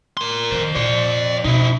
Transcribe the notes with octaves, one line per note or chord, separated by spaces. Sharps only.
A#4 C6
F2 D3 D#3 C5
A#2 D5 C6
B2 D#4 E4